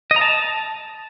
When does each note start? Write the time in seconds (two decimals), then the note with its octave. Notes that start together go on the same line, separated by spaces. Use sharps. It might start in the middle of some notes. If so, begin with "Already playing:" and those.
0.11 D#5
0.16 A#5
0.21 A5